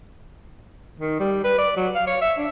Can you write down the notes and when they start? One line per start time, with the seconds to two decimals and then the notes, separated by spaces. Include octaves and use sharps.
1.00 D#3
1.20 G3
1.44 B4
1.58 D5
1.77 F#3
1.95 F5
2.07 C#5
2.21 E5
2.38 D4